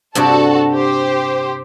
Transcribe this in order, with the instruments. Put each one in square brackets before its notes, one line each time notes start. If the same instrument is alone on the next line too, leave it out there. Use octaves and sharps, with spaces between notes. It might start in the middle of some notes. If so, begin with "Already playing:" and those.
[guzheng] G2 C3 D4 [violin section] F#4 A4 A5
[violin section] G4 C5